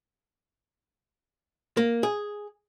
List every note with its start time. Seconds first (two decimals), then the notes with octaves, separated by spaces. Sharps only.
1.77 A#3
2.03 G#4